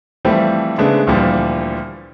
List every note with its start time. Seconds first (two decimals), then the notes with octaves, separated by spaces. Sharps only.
0.25 E3 F3 G3 A3 C4
0.78 C#3 G#3 A3 B3 D4
1.07 D2 A#2 E3 F3 G3